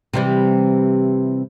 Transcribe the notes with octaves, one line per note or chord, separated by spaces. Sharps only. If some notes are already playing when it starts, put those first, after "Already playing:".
C3 E3 G3